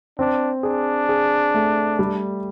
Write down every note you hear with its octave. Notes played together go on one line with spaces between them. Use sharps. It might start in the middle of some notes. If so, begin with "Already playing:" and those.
C4 D4
D4 G#4
G#4
A3
G3